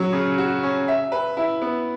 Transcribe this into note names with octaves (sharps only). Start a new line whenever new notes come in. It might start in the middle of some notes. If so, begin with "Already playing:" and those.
Already playing: F#3 C#4
C#3
F#4
C#4
E5
B4
E4
B3